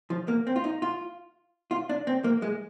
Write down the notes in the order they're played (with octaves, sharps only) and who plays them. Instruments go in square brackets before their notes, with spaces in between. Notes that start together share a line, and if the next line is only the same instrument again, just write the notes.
[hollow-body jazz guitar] F3
A#3
C4
F4
D#4
F4
F4
D4
C4
A#3
G#3